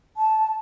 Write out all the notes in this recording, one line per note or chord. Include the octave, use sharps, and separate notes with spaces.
A5